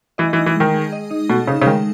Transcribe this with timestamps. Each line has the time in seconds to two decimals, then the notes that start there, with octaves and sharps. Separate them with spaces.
0.18 E3 D#5
0.33 E3
0.38 D#4
0.46 E3
0.56 D#3 G#3
0.74 G#4
0.93 D#5
1.11 D#4
1.30 B2 A4
1.47 C#3 D#4
1.62 C#3
1.66 D#3 G#3